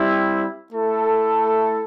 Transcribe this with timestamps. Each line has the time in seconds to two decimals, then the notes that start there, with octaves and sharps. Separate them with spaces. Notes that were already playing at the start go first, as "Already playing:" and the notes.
Already playing: G3 C4 E4
0.73 A3 E4 A4